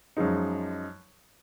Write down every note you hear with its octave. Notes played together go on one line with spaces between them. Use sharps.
F#2 F3 G#3 D#4